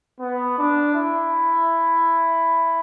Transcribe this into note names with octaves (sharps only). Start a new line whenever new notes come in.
B3
D4
E4